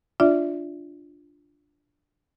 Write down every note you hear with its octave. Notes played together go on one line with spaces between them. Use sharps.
D4 F4 D5 E5